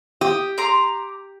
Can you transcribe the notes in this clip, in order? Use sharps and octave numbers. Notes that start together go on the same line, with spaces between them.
G4 D#6
A#5 C6 D6